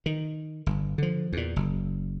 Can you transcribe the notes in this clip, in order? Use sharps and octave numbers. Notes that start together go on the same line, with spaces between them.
D#3
G1
D3 F3
E2 A#2
F#1